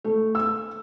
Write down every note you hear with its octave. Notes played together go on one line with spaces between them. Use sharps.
A3
E6